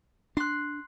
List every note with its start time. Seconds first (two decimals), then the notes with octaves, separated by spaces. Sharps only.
0.37 D4 C6 F#6